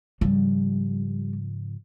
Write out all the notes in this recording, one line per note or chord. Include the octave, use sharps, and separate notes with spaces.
G#2 C#3 F3 G3